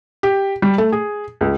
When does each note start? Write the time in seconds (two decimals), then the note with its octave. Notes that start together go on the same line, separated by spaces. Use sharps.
0.23 G4
0.62 G3
0.78 A3
0.92 G#4
1.41 C#2